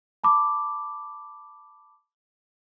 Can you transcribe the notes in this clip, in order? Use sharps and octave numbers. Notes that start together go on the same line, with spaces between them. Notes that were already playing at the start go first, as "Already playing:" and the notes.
A5 B5 D6